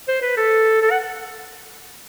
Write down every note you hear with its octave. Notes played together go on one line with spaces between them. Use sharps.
C5
B4
A4
A4
F#5